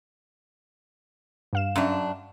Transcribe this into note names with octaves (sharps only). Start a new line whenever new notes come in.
G2 F5 E7
F#2 D4